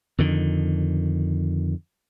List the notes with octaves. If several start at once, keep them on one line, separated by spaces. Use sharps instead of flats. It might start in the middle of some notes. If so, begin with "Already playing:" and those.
F2 D3 D#3